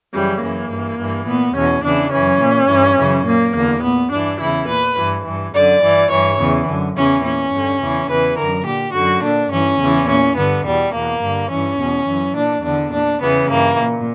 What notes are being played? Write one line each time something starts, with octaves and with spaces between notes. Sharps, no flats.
F#2 C#3 E3 G3
F#2 E3 A#3
G2 E3
G2 E3
A#2 B3
E2 B2 C#4
E2 C#3 E3 D4
F#2 E3 C#4
A#2
G2 E3
F#2 C#3 E3
A#2 A#3
E2 D3 A#3
A#2 B3
G2 E3 D4
E2 C#3 E3 E4
A#2 B4
G2 E3
G2 E3
F#2 D3 D5
G2 E3
G2 E3 C#5
E2 C#3 E3
F#2 D3
E2 C#3 E3 C#4
A#2 C#4
G2 D3
E2 C#3 E3
E2 C#3 E3 B4
F#2 D3 A#4
A#2 G4
F#2 D3 F#4
A#2 D4
G2 E3 C#4
E2 C#3 E3
A#2 C#4
G2 D3 B3
E2 B2 G3
E2 B2 A#3
G2 D3
G2 E3 C#4
E2 B2
F#2 E3
A#2 D4
E2 D3 D4
A#2 D4
E2 C#3 E3 B3
G2 E3 A#3
A#2